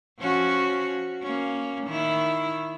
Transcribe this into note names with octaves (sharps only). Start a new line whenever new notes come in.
F3 C#4 F#4
A#3 C#4
D#3 E4